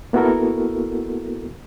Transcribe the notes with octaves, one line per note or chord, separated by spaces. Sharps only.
A#3 B3 E4 F#4 A4 A#4